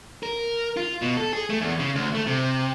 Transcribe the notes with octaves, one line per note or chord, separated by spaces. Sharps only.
A#4
F4
B2
A4
G#4
A3
E2
C#3
D2
A3
C3